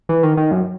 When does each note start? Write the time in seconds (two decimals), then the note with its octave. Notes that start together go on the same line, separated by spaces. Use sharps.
0.09 E3
0.23 D#3
0.37 D#3
0.51 F#2